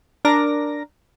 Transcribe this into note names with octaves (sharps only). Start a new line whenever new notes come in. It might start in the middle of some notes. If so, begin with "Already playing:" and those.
D4 A#4 D6 A#6